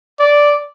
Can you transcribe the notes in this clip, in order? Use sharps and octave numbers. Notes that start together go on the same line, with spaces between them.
D5